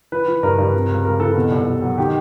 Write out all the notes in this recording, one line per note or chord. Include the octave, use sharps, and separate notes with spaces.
E3 B4
E3
G2 A#4
G2
C3
C#2
C#2 A#4
E3 A4
B2
C2
C2
F#3
D#3 G4